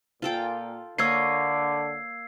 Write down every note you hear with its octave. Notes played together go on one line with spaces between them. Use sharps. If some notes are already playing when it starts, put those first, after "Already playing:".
A#2 F4 A4 G5
D3 A#3 C#5 D#5 E6 G#6 C7